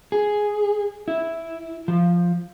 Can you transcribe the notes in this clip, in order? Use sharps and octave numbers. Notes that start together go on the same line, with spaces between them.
G#4
E4
F3